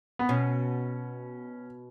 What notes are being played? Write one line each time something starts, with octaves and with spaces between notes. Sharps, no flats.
B3
B2 C#4